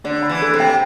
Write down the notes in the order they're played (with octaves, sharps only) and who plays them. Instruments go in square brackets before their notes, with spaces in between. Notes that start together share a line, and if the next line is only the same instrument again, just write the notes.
[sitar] D3 [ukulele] D5
[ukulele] B5
[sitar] E3
[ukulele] A4
[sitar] C3
[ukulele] G5